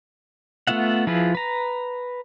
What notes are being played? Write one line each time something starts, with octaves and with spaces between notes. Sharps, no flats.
A3 B3 F4 E5 F#5
F3 E4 F4 G#4 B4
B4 A#5